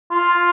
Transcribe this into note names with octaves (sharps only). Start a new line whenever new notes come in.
F4